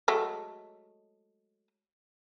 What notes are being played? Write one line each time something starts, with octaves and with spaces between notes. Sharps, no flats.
F#3 G#3 A3